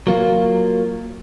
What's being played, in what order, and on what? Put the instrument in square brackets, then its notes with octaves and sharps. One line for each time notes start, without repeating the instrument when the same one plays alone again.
[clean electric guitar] F#3 A#3 F4